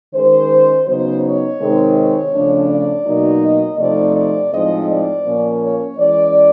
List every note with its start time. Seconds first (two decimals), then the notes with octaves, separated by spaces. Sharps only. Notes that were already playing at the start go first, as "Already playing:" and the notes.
0.14 D#3 G#3 C#4 C5
0.86 C#3 F#3 B3 D#4 C5
1.23 C#5
1.59 C3 D#3 G#3 C4 D#4
1.97 C#5
2.33 C#3 F3 A3 D4
2.69 D5
3.05 B2 F#3 A#3 D#4
3.43 D#5
3.78 C3 F3 A3 C4 D#4 D5
4.15 D5
4.51 A2 F3 G#3 C4 D#4 D#5
4.88 D5
5.25 A#2 F3 A#3 C#4
5.62 C#5
5.98 E3 G#3 C#4 D5